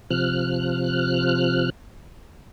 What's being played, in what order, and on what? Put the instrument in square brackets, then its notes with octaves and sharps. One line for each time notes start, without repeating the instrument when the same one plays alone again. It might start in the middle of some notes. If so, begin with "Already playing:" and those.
[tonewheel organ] C3 F3 F6 F#6